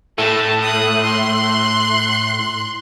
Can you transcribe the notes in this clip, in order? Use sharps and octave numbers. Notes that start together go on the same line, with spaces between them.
A2 A3 A5
D#6 F#6
C6 F#6